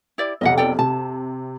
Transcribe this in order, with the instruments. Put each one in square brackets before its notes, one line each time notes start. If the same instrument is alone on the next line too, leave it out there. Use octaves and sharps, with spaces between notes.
[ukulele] E4 G4 D5
[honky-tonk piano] B1 F2 C3 [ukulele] D#5 E5 F#5
[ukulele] A4 D5 G5
[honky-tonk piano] C3 [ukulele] A5